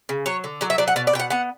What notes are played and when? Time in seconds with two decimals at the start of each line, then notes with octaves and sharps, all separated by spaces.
0.09 C#3
0.26 F#3 C#5
0.44 D3
0.61 F#3 D5
0.70 E5
0.78 F#3 D5
0.88 F#5
0.96 B2 D5
1.07 D5
1.13 B2 G5
1.19 F#5
1.30 B3 F#5